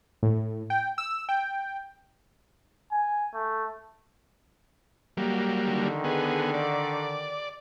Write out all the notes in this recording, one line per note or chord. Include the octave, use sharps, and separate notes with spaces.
A2
G5
E6
G5
G#5
A3
F#3 G3 A#3
D3 D#3
B3 G#4
D5